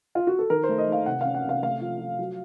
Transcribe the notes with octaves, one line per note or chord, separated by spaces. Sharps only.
F4
F#4
A4
D#3 A#4
C5
A3
D#5
D#3 F5
C3 F#5
C#4 F5
F#5
C3 F5
A3 F5
F3
F3
F#3